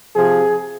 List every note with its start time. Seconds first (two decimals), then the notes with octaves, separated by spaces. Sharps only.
0.15 C3 F3 G#4